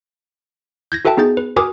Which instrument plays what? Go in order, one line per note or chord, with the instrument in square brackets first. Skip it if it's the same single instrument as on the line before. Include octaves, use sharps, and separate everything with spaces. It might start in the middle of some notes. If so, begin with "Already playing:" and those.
[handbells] G6 G#6 A#6
F#4 A4 B4 E5 G5 A5
B3 D#4 G#4 G6 A6
B4
F#4 A#4 B4 G#5 D6 D#6